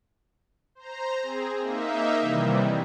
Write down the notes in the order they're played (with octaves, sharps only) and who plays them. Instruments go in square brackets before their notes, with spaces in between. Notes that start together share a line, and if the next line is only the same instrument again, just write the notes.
[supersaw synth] C5 A#5
C4 G#4
A#3 D#4 E5
C3 D#3 E3 G3